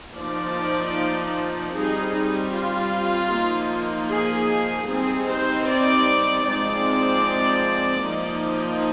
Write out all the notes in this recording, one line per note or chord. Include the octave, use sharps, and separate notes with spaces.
F3 A#3 D#4 D5
G3 C4 D#4 G#4
D#4
F4
F3 A#3 D#4
G#4
G3 C4 D#4 G#4
C5
D5
F3 G#3 C4 D#4 D5
F3 A#3 D#4